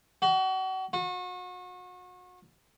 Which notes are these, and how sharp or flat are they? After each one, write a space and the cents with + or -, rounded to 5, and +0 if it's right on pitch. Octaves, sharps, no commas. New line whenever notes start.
F#4 +35
F#4 -35